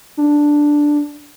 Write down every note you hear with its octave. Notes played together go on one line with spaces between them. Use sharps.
D4